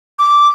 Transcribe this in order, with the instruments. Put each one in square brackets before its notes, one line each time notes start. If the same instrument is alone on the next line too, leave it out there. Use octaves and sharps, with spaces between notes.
[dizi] D6